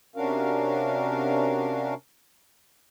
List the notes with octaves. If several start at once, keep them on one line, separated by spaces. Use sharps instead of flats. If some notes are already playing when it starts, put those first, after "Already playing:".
C3 C#4 D4 F#4 A#4 F5